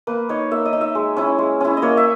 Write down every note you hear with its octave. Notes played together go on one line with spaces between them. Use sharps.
A#3 B4
D#4 C#5
A#3 E5
D#5
D#4
E5
G#3
C#4 E4
G#3
C#4 E4
D#5
A#3 C#5
E5